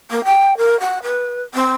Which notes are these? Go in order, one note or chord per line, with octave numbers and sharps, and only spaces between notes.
A#3
G5
A#4
F#5
B4
C4